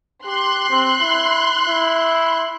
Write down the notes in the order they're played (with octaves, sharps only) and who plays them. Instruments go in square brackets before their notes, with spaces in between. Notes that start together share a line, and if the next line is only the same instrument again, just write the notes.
[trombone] G4 [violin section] C6 F#6
[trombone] C4
E4
E4